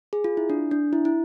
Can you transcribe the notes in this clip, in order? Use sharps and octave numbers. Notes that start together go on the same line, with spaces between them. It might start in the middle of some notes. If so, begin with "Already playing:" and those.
G#4
F4
E4
D4
D4
E4
E4